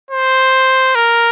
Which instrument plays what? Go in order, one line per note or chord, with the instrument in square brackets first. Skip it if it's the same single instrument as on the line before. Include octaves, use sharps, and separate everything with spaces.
[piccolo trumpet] C5
A#4